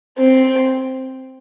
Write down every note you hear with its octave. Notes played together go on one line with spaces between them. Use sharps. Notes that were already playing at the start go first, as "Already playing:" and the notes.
C4